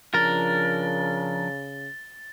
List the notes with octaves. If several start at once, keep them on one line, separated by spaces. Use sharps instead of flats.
C#3 F3 D4 A#4 A6 G7